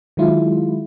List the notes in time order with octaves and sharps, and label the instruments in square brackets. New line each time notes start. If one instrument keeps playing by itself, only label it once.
[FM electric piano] D#3 F#3 G#3 E4 F4